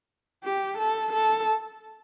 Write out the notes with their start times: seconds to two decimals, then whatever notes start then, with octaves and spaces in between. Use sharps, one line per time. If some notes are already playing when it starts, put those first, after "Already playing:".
0.44 G4
0.78 A4
1.13 A4